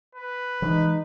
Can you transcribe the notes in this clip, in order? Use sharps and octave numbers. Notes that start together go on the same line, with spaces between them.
B4
E3 G#3 D#4